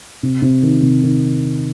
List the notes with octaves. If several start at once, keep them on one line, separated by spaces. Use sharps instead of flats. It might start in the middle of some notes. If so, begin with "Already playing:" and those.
C3
C3
D#3
C3
D#3